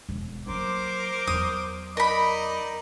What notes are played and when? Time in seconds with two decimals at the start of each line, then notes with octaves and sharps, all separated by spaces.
0.09 E1
0.47 F#3 A#3 A#4 C5 D6
1.27 E2 F#3 D#6
1.97 D#4 A#4 D5 D#5 B5